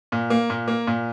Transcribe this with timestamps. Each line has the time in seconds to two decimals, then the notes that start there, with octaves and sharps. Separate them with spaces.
0.12 A#2
0.30 A#3
0.50 A#2
0.68 A#3
0.87 A#2